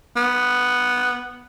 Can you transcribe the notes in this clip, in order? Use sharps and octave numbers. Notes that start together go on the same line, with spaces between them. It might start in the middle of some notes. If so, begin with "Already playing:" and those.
B3